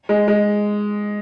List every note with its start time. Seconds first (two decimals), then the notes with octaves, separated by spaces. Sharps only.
0.09 G#3
0.28 G#3